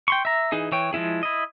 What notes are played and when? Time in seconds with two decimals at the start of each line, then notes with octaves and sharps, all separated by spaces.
0.08 G5 C6 C#6
0.25 E5 A#5
0.52 E3 D#4 G#4
0.72 E3 C#5 G5
0.93 F3 G#3 C#4 E4 G#4
1.23 E4 D#5